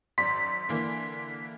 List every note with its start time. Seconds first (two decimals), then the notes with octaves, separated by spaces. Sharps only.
0.18 G#1 F#2 D5 C6 B6
0.69 D3 E3 A#3